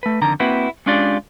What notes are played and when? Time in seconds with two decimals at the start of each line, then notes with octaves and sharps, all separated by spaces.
0.03 A3 B4
0.22 F2 D3 D#3 A#5
0.40 A#3 C4 E4 F#4 B4 F#5
0.86 G#3 C#4 D4 F4 G4 D5